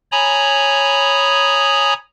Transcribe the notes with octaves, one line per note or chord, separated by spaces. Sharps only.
C#5 G#5 A#5 B5 D#6